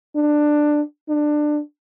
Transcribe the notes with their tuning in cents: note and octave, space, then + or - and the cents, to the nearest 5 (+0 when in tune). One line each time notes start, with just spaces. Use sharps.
D4 +15
D4 +20